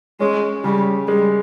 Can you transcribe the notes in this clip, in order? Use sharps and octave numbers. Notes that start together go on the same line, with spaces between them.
G#3 C#4
C#3 G3
G3 G#3